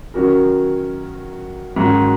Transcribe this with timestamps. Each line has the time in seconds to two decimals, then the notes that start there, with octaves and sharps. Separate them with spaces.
0.14 D#3 F#3 C#4 F#4 A#4
1.76 G#2 D#3 F#3 C#4 F#4